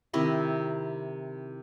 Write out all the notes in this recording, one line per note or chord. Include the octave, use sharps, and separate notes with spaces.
C3 D#3 E4 D#5